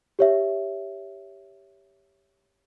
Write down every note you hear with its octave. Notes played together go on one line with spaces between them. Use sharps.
G4 C#5 E5